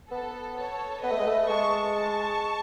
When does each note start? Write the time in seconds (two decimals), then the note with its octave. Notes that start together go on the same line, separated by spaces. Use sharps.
0.11 B3 A4
0.57 A4 C#5
1.03 B3 B4 D#5
1.12 A3
1.19 G#3
1.27 A3
1.49 G#3 A5 C#6
1.95 A5 C#6